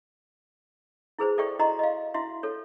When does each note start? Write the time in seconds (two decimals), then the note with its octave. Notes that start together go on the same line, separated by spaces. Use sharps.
1.19 E4 G#4 B4 C5
1.38 A4 D5 E5 G5 C#6
1.59 E4 F#4 D#5 A#5 C6
1.79 D#5 F5
2.14 E4 F#4 E5 C6
2.43 A4 C#5